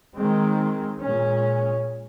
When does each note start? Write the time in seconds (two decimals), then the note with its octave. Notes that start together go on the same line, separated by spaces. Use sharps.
0.16 D#3 G#3 C4
1.00 A#2 G#3 C#4